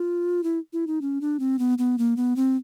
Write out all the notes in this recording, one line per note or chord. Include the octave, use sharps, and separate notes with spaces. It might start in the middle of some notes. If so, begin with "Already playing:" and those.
Already playing: F4
E4
E4
D#4
C#4
D4
C4
B3
B3
A#3
B3
C4